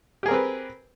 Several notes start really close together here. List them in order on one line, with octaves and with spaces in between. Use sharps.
G4 G#4 A#4 C4 B4